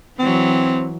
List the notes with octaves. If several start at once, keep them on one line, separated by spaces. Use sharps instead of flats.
E3 F#3 C4